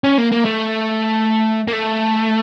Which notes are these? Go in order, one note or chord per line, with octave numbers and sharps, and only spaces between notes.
C#4
A#3
A#3
A3
A#3
A3